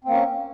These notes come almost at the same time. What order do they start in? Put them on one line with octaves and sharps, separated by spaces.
C4 A#3 C#4